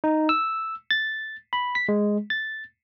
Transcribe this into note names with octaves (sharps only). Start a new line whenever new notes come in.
D#4
E6
A6
B5
B6
G#3
A6